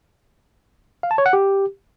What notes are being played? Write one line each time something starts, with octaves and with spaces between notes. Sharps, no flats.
F5
A5
C#5
F#5
G4